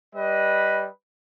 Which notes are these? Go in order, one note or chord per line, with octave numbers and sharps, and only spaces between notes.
G3 B4 D#5